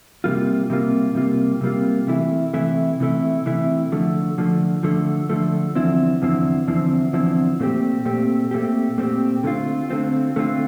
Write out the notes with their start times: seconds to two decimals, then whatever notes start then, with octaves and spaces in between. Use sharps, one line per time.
0.24 C3 G3 A#3 F4
0.70 C3 G3 A#3 F4
1.15 C3 G3 A#3 F4
1.61 C3 G3 A#3 F4
2.07 C3 E3 A3 E4
2.53 C3 E3 A3 E4
3.00 C3 E3 A3 E4
3.45 C3 E3 A3 E4
3.92 D3 F3 A3
4.38 D3 F3 A3
4.83 D3 F3 A3
5.29 D3 F3 A3
5.75 E2 D3 F3 C4 E4
6.22 E2 D3 F3 C4 E4
6.68 E2 D3 F3 C4 E4
7.13 E2 D3 F3 C4 E4
7.60 A#2 A3 C4 G4
8.05 A#2 A3 C4 G4
8.51 A#2 A3 C4 G4
8.98 A#2 A3 C4 G4
9.43 D3 A3 C4 F4
9.89 D3 A3 C4 F4
10.36 D3 A3 C4 F4